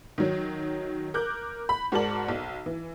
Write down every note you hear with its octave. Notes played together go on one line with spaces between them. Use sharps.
D#3 F#3
A#4 D6 F#6 G6
B5
G#2 F#4 A#4 D5 A5 F#7
B1
E3